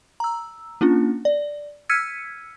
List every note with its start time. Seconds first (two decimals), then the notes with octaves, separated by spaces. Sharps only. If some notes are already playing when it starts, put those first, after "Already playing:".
0.20 A#5 E6
0.81 A#3 C#4 D4 F4
1.25 D5
1.89 E6 F6 G#6 B6 C#7 D#7